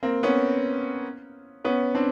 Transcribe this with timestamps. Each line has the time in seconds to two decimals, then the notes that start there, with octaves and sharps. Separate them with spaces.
0.03 A#3 C4
0.23 B3 C#4
1.65 B3 C#4
1.95 C4 D4